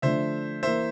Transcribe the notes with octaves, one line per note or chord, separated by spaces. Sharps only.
D3 F3 A3 D4 C5 E5
E3 A#3 E4 C5 E5